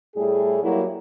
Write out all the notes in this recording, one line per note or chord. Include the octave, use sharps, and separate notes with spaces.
A2 G3 A3 G#4
F#3 G3 A#3 E4 F#4 G4